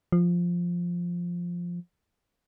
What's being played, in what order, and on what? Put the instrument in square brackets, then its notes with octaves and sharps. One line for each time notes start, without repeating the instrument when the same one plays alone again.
[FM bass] F3